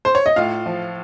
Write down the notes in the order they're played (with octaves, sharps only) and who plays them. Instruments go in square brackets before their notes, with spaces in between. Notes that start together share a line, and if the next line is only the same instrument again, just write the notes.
[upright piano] C5
C#5
D#5
A2 F4 F5
F3